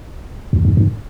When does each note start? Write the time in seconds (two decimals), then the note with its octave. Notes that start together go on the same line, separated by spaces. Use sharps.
0.53 E2
0.65 F2
0.77 G2